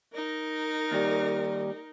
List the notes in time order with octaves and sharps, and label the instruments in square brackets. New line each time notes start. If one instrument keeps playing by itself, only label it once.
[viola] D#4 A#4
[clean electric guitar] D#2 G3